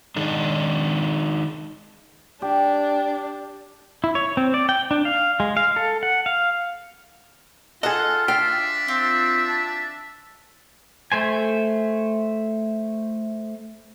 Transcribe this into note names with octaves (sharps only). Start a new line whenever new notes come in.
D#3 G#3 D4 D#4
D4 G4
E4
C#5
C4
D5
G5
D4
F5
G#3
F5
A4
F#5
F5
F4 G#4 A4 D#5 F#5
D4 E5 F5 G5
C4 F4
A5
A3 C5 G#5